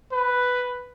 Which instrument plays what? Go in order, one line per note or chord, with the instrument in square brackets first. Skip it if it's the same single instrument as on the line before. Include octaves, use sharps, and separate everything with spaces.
[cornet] B4